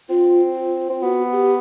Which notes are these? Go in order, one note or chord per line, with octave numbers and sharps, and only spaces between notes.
C4 F4
F4
C4
B3 F#4
G4